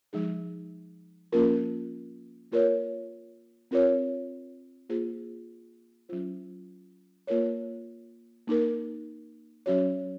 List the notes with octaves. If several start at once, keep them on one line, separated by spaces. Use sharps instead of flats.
F3 G#3 D#4 G#4
F3 A#3 C#4 F4 A#4
A#3 F4 A#4 C#5
C4 F4 A#4 C#5
A#3 F4 G#4 C5
F#3 C#4 F4 C5
A#3 F4 A#4 C#5
A#3 D#4 A#4
F#3 C#4 F#4 C#5